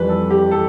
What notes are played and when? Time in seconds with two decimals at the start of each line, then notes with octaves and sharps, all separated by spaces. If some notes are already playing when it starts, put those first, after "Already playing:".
Already playing: F2 E3 G3 B4
0.09 A4
0.30 G4
0.51 E3 A4